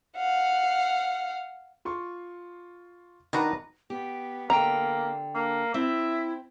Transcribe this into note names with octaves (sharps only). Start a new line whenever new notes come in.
F5 F#5
F4 C6 C#6
D#3 D4 D#4 F#4 B4 A#5
B3 G4
D3 A#3 G5 A#5
A#3 D4
C4 E4 E5